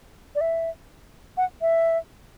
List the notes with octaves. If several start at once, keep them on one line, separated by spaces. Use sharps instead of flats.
D5
E5
F#5
E5